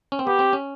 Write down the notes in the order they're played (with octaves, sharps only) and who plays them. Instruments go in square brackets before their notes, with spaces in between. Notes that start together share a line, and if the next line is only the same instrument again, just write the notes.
[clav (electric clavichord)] C#4
C4
[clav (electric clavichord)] B3 [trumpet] G4
[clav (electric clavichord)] C4
C#4